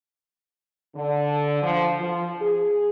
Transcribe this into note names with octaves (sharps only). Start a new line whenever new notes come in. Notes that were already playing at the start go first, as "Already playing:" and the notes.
D3
F3
F3
G#4